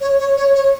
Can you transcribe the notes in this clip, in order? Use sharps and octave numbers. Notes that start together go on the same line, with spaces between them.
C#5
C#5
C#5
C#5